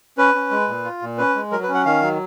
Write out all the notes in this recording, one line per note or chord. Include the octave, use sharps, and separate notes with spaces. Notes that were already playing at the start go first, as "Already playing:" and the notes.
C#4 B4
C#4
G#3
A#2
F4
A#2
C#4 B4
G#3
F#3 A#4
B4
C#4
F#5
D#3 F5
F#3